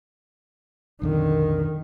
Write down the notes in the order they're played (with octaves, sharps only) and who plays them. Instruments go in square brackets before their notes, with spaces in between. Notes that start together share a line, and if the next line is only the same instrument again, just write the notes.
[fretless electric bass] B1 F2 D3 [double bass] D#3